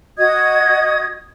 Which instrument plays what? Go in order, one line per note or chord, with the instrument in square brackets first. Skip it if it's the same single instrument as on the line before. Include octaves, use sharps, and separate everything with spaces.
[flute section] F#4 D#5 D#6 G#6